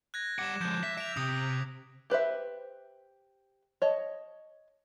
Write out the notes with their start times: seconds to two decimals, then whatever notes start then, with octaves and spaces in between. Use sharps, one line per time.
0.14 F#6 G#6 A#6
0.39 G3 F#5 D6 E7
0.61 F3 G#3 G6
0.83 E5 B6
0.98 E5 D7 F7
1.17 C3 D#6
2.10 G4 B4 C5 E5
3.82 C#5 D#5 A5